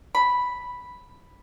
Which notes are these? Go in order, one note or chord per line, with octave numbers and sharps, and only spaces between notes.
B5